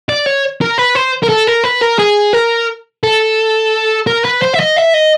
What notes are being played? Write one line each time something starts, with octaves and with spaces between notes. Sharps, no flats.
D5
C#5
A#4
B4
C5
A#4
A4
A#4
B4
A#4
G#4
A#4
A4
A#4
B4
C5
E5
D#5
E5
D#5